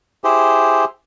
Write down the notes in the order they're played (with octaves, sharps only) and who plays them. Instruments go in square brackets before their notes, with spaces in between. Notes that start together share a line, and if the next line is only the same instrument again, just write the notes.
[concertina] E4 G4 G#4 C5